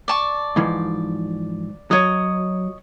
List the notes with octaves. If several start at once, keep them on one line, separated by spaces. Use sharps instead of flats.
D5 A5 C#6
G#2 E3 F3
F#3 C#5 D#5 D#6